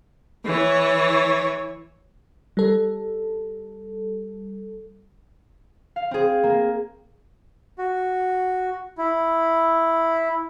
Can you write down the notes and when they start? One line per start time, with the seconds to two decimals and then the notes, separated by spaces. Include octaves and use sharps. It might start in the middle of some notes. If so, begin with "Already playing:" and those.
0.45 E3 C#5
2.57 G3 A4
5.96 F5
6.11 C4 G#4
6.43 A#3
7.78 F#4
8.98 E4